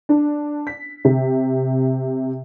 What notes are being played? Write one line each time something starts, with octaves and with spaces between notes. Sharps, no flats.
D4
B6
C3